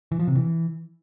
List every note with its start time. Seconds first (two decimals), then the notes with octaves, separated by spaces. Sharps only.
0.12 E3
0.20 F3
0.28 C3
0.36 E3